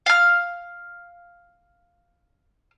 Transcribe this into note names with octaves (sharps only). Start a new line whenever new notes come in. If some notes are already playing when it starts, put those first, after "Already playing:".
F5 F6